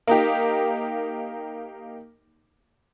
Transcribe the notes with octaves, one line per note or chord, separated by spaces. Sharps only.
A#3 D#4 G4